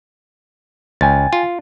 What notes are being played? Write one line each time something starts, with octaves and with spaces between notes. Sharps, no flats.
C#2 G5 G#5 A6
F4